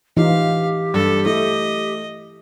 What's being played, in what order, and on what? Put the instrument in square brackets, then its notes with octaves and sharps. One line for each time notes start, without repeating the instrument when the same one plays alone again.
[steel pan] E3 D#4 F4 [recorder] G4 [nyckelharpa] F5
[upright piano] G2 [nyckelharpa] A4
[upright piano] A3 [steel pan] E4 [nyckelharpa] D#5